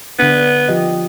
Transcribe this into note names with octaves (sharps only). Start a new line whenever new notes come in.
D3 B3 D4
F3 G4 D#5